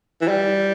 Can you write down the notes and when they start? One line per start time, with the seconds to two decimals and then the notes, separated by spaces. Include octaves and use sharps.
0.21 E3
0.29 G3